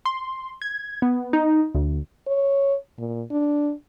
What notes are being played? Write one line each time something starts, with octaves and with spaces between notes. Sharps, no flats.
C6
G#6
B3
D#4
D2
C#5
A#2
D4